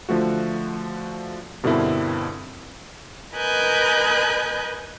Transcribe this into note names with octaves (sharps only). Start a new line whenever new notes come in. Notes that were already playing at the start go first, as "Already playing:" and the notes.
D3 F3 A3 F#4
G2 B2 D3 C4 E4 A#4
A#4 B4 D#5 G#5 F#6 G6